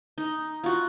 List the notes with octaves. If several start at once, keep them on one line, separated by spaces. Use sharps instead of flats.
D#4
F4 F#4